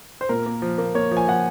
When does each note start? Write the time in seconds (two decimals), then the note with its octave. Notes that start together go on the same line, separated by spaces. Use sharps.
0.21 C5
0.29 A#2 A#4
0.46 A#3
0.62 F3
0.78 A#3
0.95 A#3 C#5
1.11 F3
1.17 G#5
1.28 F3 F#5